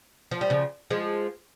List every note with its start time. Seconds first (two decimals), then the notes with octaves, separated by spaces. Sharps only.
0.31 F3
0.41 G3
0.50 C#3 F3
0.90 F3 G#3